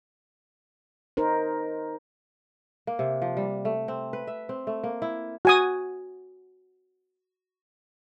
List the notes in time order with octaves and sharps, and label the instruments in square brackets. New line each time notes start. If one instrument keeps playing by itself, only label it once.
[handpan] D#4 A#4 C5
[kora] A#3
C3
F3
G3
A3
C4
B4
E5
C4
A3
A#3
E4
[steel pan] F#4 G#5 D#6